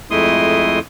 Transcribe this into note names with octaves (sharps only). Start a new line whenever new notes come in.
F2 G#3 A3 E4 C6 D#6